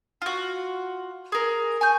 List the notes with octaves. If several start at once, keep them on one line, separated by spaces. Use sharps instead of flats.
F4 F#4
G#4 A#4
G#5 C#6 G6